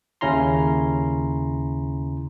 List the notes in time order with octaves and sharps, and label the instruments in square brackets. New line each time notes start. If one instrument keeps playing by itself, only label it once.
[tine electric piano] D#2 C#3 C#4 E4 A#5 C6